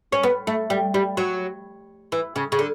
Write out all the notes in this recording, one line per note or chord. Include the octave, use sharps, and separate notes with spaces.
C#4
B3
A3
G3
G3
F#3
E3
C#3
C#3
D3